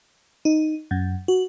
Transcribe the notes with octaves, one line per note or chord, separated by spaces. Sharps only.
D#4
F#2
F#4